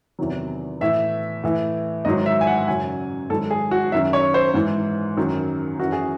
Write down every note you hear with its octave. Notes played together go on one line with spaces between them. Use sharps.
E2 C3 D#3 F#3
A2 E3 E5
A2 E3
G#2 D#3 F#3 D#5
E5
G#5
F#5
F#2 C#3 F#3 G#5
G#2 D#3 F#3 A4
G#4
F#4
F#2 D#3 F#3 E5
C#5
C5
G#2 E3
F#2 D#3 F#3
F#2 E3 F#4
G#4